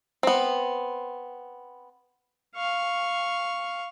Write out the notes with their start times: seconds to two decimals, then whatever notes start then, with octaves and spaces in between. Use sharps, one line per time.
0.23 B3 C4
2.56 F5 C#6